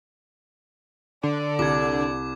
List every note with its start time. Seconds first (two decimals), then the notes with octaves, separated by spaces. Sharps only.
1.23 D3 D5
1.59 C2 D6 G#6